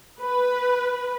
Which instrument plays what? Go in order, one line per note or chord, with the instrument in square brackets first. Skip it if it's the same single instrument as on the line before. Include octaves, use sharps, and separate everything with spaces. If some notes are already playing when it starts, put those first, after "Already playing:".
[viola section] B4